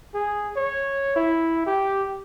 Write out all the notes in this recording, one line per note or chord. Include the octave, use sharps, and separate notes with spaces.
G#4
C#5
E4
G4